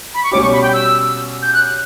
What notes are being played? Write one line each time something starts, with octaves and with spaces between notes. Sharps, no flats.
B5
C#6
B2 G3 C#4 G4 D6
C#6
B5
G5
E6
G6
F#6